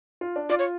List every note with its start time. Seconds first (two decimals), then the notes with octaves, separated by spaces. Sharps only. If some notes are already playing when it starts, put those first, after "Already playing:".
0.21 F4
0.36 D4
0.49 F4 D5
0.59 C#5